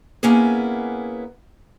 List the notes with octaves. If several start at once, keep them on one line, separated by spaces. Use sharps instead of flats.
A#3 B3 C#4 E4 G#4